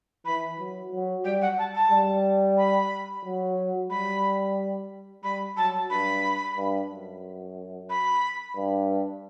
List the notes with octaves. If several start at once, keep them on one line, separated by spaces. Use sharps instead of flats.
E3 B5
F#3
F#3
G3 G5
F#5
A5
A5
G3
B5
F#3
G3 B5
G3 B5
F#3 A5
G2 B5
G2
F#2
B5
G2